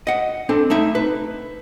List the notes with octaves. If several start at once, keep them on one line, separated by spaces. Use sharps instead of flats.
D#5 F#5
C4 D4 A4
A3 D#4 E5
B4